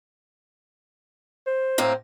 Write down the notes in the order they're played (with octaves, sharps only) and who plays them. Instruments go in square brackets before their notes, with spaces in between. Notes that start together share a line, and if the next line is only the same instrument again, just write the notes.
[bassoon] C5
[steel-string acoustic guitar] A2 A#3 C4